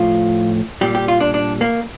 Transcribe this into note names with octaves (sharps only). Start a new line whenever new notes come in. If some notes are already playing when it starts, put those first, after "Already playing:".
Already playing: A2 F3 F4
A#2 G3 G4
G4
F4
D4
D4
A#3